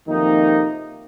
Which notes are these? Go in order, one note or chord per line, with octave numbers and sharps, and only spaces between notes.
F2 C3 D#3 A#3 D#4